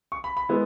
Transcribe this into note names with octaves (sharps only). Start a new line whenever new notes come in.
C#6
B5
B5
G#3 B3 E4